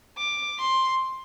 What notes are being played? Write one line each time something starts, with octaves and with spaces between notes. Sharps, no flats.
D6
C6